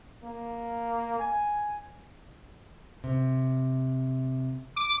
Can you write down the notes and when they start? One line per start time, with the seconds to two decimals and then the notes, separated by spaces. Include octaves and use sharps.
0.24 A#3
1.19 G#5
3.04 C3
4.76 D6